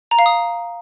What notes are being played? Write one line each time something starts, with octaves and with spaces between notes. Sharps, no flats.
A#5
F5
D#6